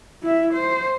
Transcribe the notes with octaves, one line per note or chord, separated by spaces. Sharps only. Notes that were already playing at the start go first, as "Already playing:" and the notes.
E4 E5
C5